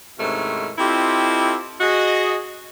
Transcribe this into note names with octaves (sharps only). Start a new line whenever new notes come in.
G#2 C3 D#3 A3 C#4 E4
C4 E4 F4 G4 A4 D#5
F#4 G#4 D#5